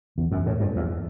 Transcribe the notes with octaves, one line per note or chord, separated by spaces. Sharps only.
E2
F#2
A2
G2
E2